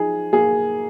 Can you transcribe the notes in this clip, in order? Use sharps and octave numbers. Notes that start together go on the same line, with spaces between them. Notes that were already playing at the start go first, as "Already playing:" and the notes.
Already playing: F3 D#4 G#4
A#3 G#4